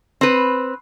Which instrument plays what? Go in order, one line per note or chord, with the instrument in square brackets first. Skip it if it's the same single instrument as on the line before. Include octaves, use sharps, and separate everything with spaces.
[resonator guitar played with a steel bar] C4 B4